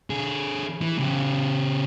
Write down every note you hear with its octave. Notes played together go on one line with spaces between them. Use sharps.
D3 G#4
E3
C#3 G4